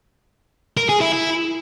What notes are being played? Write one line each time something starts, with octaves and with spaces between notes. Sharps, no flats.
A#4
G#4
E4
E4